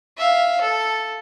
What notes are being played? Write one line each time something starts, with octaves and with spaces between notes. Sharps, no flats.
E5 F5
A4